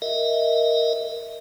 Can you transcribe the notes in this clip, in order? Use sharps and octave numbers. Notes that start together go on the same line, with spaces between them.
A#4 D#5 E5